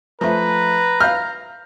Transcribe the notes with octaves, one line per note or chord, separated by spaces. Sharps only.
F3 A3 B4 A#5
F5 F6 G6